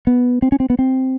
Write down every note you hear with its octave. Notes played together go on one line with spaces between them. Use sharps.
B3
C4
C#4
C4
B3
C4